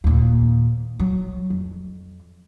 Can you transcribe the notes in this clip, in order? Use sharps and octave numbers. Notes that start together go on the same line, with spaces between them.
D#2 A#2
F#3
F2